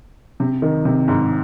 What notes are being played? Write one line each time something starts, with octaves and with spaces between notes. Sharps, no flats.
C3
D#3
C3
G#2